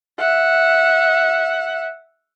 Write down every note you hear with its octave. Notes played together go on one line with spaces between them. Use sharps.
E5 F#5